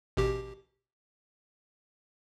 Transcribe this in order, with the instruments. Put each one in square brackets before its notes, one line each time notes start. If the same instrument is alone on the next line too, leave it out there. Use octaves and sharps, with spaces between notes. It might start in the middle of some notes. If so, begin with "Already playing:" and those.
[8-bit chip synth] A1 B2 G4